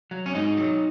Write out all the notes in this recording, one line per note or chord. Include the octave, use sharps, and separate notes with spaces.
F#3
C#4
G#2 D#4
F#3